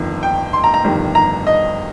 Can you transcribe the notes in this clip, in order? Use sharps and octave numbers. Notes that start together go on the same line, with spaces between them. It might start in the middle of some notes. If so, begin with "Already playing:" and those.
Already playing: G1 F2 D#3
G5
C6
A#5
A#5
G1 F2 D#3 G3
A#5
D#5